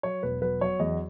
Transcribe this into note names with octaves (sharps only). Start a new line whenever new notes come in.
F#3 C#5
E1 B4
F#3 B4
F#3 C#5
E2 D#5